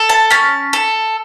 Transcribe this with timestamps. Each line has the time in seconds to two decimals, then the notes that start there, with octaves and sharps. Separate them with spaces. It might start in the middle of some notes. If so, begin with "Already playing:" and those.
Already playing: A4
0.09 A5
0.31 C#4 A5
0.73 A4